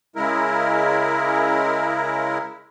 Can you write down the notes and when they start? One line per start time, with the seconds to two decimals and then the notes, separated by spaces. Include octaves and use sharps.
0.16 C#3 G#3 E4 A#4